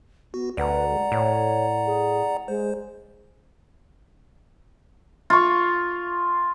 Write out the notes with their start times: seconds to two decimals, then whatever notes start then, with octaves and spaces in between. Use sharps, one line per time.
0.34 B3 F#4
0.57 D2 B4 D5 F#5 A#5
0.91 G#3
1.12 A2 C#5
1.86 G#4
2.48 G#3 C5
5.30 F4 C#6